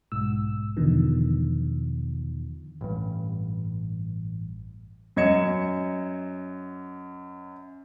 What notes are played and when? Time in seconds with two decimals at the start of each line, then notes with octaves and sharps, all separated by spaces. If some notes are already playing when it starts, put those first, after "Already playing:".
0.12 B1 G#2 E6
0.77 E2 B2 D3 D#3 F3
2.81 A1 G2
5.16 F#2 D#5 G#6 C#7 E7